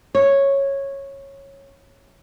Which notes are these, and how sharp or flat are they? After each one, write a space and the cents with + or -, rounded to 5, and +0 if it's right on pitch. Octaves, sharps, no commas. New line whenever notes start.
C#5 -10